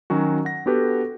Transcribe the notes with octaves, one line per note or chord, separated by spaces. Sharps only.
D#3 F#3 C#4 F#4
F#5 A#6
B3 D4 F#4 G4 A4 B4